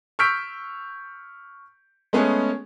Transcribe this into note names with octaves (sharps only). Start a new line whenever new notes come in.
C#6 E6 F6 G6 B6 D7
G#3 A3 B3 C#4 G#4